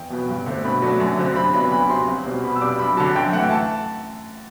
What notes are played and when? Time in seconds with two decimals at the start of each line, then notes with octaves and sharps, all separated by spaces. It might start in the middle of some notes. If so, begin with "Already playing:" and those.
Already playing: E2 G5
0.10 B2 F#3 B3
0.29 G2
0.46 D3 A3 C4
0.64 B2 B5
0.82 F#3 A3 D4
1.00 F#2
1.17 D3 F#3 C4
1.36 C3 B5
1.54 F#3 B3 D4 B5
1.71 D2 B5
1.90 C3 F#3 C6
2.07 C2
2.26 B2 G3 C4
2.43 B2 B5
2.56 E6
2.61 G3 D4 D6
2.79 F#2 B5
2.97 D3 F#3 A5
3.15 F#2 G5
3.33 E3 A3 F#5
3.51 A5